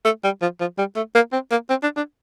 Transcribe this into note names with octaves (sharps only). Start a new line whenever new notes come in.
A3
G3
F3
F3
G3
A3
A#3
C4
A#3
C4
D4
D4